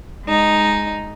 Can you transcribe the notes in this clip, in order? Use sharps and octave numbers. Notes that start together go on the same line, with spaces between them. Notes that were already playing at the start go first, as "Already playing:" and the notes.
G#3 D#4